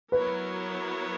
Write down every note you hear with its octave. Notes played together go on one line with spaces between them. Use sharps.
F#3 B3 E4 A#4 B4 C#5